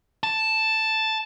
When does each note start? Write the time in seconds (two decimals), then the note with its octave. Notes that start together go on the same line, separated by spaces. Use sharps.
0.23 A5